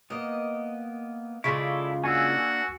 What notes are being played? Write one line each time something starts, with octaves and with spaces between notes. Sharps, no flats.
A#3 B3 D#5
C#3 G#3 E4 F4 A4 D5 C#6
A#3 D4 F#4 G#5 E6